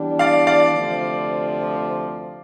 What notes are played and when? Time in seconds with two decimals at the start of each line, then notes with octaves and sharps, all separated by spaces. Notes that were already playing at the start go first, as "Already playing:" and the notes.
Already playing: E3 G3 B3 D4
0.19 D5 F5
0.47 D5 F5
0.74 D2 C3 F3